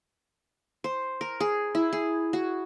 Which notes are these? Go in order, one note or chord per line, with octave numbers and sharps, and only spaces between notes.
C5
A#4
G#4
E4
G#4
F#4